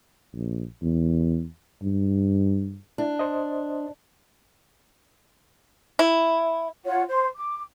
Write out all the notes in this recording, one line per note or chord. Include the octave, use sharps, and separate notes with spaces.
A#1
E2
G2
D4 E4
C5 D#5
E4
F4 C#5 F#5
C5
D6